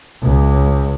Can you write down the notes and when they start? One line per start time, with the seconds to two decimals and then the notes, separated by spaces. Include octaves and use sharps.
0.22 C#2